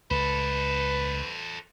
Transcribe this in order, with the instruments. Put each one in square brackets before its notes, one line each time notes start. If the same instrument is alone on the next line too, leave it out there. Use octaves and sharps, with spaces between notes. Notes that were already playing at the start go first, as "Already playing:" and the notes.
[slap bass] C#2 [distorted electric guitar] A4 C5 [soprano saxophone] B4